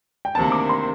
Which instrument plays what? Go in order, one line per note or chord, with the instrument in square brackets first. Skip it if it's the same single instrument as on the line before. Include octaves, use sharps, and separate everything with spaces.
[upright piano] G5
[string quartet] D2 C3 D#3 A#3 [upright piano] A5
[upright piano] D6
C6